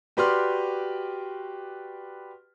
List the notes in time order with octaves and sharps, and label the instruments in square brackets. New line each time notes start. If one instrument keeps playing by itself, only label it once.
[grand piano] F#4 G4 B4 D5 C6 F6